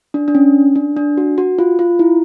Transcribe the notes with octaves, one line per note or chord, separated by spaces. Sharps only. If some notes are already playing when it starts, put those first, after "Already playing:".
D4
D4
C#4
D4
D4
F#4
F#4
F4
F4
E4